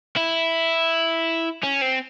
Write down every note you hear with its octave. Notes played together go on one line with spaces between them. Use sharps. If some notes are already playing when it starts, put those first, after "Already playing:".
E4
C#4
C4